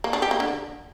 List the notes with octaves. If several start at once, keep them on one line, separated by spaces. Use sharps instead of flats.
A#3
D4
G4
A#3
D3